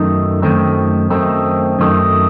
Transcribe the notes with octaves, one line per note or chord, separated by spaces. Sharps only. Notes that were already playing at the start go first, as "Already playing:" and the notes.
Already playing: F#2 D#3 A3 D#4
F#2 D#3 A3 C4 D#4
F#2 D#3 A3 C4 D#4
F#2 D#3 A3 C4 D#4